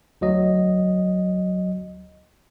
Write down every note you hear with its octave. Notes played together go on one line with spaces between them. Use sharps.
D2 F#3 D#5